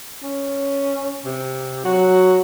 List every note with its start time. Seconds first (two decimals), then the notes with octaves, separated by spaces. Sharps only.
0.23 C#4
1.25 C3
1.85 F#3 F#4